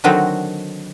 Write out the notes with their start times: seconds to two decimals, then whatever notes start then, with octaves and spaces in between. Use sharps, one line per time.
0.04 D3 D#3 F#3 C4 D#4 F#4